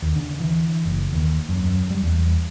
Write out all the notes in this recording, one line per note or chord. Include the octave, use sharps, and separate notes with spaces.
D#2
D3
E3
F#1
D#2
F#2
F#2
G3
E2